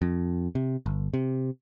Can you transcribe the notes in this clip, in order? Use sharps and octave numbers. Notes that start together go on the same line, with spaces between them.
F2
C3
G1
C3